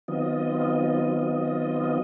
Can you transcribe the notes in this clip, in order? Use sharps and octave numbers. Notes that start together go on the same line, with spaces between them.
D#3 F#3 B3 C4 F4 D#5